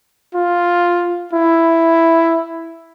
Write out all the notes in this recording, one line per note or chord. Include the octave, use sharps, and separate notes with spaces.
F4
E4